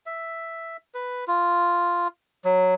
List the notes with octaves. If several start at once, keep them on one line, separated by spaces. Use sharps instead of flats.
E5
B4
F4
F#3